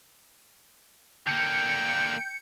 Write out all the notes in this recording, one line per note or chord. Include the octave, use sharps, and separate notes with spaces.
D3 A#3 G5 G6 C#7